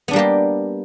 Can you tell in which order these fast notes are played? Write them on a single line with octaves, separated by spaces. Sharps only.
B3 D4 G3 A#3 G4